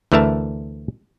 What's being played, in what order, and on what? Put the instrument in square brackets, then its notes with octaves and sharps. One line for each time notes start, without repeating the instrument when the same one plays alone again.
[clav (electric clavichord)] D2 E3 A3 A#4 E5 A5